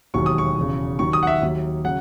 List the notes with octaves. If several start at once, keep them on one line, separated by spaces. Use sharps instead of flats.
E1 D#2 D#3 F#3 C#6
D#6
C#6
E1 E2 C#3
D#2 D#3 F#3 C#6
D#6
F#5
E5
D#2 D#3 F#3
C#3 F#3 F#5